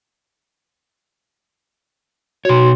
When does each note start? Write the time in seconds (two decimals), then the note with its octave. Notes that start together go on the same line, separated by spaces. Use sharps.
2.45 B2 F#4 C#5 C6